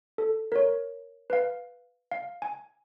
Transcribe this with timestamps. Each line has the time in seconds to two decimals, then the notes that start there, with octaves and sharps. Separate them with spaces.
0.18 A4
0.52 A#4 C#5
1.30 B4 F5
2.12 F5
2.42 G#5